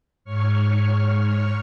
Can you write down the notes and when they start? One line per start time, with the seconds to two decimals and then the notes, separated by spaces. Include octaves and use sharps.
0.24 G#2 C#5 C#6 F6